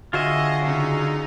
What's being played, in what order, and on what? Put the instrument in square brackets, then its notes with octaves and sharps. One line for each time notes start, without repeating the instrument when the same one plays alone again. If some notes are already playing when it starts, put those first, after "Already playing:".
[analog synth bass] D3 [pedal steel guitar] F4 G#4 E5 [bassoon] F#4 [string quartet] D#5
[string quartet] C#3 D#4